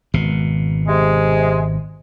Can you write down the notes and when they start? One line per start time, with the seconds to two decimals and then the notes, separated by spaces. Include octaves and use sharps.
0.14 G#1 B2
0.88 C3 G#3